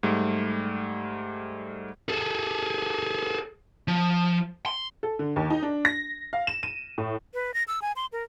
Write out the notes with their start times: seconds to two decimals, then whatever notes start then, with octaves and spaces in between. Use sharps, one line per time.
0.03 G#2 G3 A3
2.09 G#4 A4
3.88 F3
4.66 C6
5.03 A4
5.19 D3
5.36 D#2
5.50 D#4
5.63 D4
5.85 A#6
6.33 F5
6.47 E7
6.63 D#7
6.98 A2
7.34 B4
7.54 A#6
7.68 E6
7.82 G#5
7.96 C6
8.13 A#4